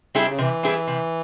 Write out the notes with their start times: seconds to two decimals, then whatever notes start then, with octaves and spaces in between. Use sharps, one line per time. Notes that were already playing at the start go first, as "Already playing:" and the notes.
0.15 C3 G3 C4 E4 G#4
0.28 C#3
0.38 C3 E3
0.63 G3 C4 E4 G#4
0.87 C3